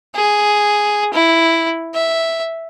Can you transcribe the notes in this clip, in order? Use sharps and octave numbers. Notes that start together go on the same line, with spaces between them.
G#4
E4
E5